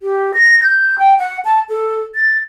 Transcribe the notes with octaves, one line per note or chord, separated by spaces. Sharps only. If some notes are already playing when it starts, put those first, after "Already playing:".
G4
A#6
G6
G5
F#5
A5
A4
A6